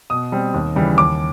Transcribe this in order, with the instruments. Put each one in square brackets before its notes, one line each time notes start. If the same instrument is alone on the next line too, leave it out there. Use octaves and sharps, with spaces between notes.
[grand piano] B2 D#6
G3 C4
D#2
C#3 E3 G3
D#2 D6